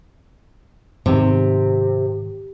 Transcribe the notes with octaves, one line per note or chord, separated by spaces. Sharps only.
G#2 C3 D#3